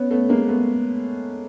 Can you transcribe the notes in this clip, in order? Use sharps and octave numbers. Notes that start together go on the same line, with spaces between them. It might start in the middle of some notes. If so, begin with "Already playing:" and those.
Already playing: B3 C#4
A3 B3
G#3 A#3
A3 B3